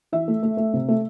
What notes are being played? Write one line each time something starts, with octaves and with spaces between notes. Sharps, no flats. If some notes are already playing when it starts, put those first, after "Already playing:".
E3 E5
A3
A3
A3
C3
A3